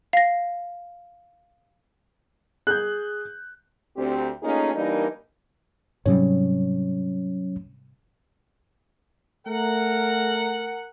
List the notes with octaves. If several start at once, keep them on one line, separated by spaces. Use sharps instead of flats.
F5 A#6
G#4 F#6 G6
D2 C4 G4
A3 A#3 C#4 D#4 F4 G#4
E3 G3 A#3 D4 D#4 A#4
G#2 C3 F#3 G3 C#4 C#5
A3 A#4 F#5